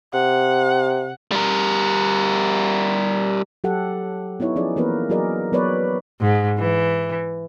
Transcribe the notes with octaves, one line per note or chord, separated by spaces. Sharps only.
C3 F#5
G3 A#4
F#3 G4 A4 F#5
B3 D#4 E4 C#5
F3 C#4 D#4 G#4 D5
E3 A#3 B3 A#4 B4
F#3 F#4 G#4 A#4 D5 D#5
F#3 B3 A#4 B4 C#5 D5
G#2
E3